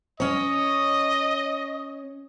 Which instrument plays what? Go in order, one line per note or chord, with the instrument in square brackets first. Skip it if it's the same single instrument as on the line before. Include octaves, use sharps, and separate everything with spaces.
[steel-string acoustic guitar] C#4 C#5 [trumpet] D#5